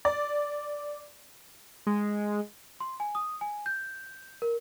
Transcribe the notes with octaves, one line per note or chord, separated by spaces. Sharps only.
D5
G#3
C6
G#5
D#6
G#5
G6
A#4